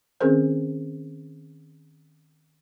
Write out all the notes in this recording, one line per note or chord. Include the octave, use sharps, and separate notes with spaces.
D#3 C4 C#4 G#4 A#4 C5